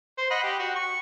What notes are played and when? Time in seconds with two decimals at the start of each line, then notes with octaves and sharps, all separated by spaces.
0.18 C5
0.31 D#5 F#5 B5
0.43 G4
0.59 F#4
0.76 C#6